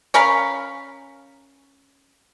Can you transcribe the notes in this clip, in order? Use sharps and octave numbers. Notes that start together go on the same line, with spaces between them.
C#4 A#4 F5 B5